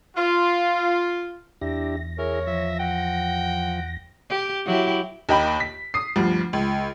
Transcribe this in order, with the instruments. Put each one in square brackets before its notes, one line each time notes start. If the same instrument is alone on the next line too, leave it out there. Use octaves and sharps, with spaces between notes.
[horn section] F4
[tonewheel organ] E2 A#6 [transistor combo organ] D4 E4 G4
[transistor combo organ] E4 G#4 [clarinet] A#4 [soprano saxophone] C#5
[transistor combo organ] F3 [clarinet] E5
[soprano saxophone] F#5 [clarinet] G5
[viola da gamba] G4
F#3 E4 G4
[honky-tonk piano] D#2 A#3 D#5 G5 B5
B6
D#6 C7
D2 G2 F3
C#2